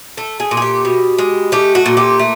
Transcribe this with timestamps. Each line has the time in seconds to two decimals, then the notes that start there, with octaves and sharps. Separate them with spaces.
0.17 A3 A4
0.40 G#4
0.51 A#2
0.57 G#4
0.62 G4
0.85 B2
1.18 G#3
1.52 A3 G4
1.75 F#4
1.86 A#2
1.97 G4
2.20 A3